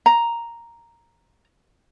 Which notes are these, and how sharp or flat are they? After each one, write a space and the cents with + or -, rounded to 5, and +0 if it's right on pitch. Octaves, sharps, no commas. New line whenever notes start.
A#5 +0